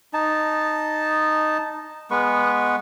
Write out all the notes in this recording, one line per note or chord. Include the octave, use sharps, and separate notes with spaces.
D#4 A5
G#3 B3 B4 C#6